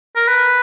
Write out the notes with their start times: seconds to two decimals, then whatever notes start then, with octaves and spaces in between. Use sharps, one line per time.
0.16 A#4
0.27 B4